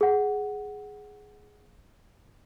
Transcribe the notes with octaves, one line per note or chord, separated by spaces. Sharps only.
G#4 F#5